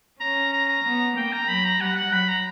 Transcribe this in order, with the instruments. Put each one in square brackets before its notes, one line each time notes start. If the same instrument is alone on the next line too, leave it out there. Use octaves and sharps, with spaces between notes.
[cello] C#4 [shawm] A#5
[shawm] A#5
A#5
[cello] B3
[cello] A#3 [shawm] G5
[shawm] A#5
[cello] F#3 [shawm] B5
[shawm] A#5
[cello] G3 [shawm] F#5
[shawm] F#5
[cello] F#3 [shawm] B5
[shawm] A#5